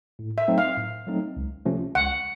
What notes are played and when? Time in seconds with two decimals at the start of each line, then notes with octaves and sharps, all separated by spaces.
0.19 A2
0.38 E5
0.48 F#3 A3 C4 D#4
0.58 F5
0.78 A2
1.07 F#3 A3 C4 D#4
1.36 C#2
1.66 C3 F3 A3 C#4
1.95 C#2 F#5